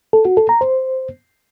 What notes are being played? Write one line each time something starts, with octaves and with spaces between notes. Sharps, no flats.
A4
F#4
A4
A#5
C5